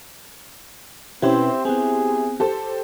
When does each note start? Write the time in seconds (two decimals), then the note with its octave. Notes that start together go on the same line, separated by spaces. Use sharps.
1.22 B2 C4 C#4 E4 G4 B4 C5
1.65 B3 C4 G#4
2.40 G4 A4 C5